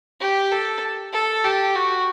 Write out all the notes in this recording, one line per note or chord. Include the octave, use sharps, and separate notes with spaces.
G4
A4
A4
G4
F#4